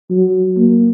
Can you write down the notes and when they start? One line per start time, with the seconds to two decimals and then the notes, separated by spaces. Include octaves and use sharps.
0.10 F#3
0.57 A#3